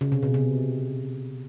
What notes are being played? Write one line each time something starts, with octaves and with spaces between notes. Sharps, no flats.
C#3
C3
B2
C3